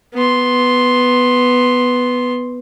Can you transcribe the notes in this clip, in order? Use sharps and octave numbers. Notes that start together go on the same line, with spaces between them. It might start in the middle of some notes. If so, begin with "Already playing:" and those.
B3 C6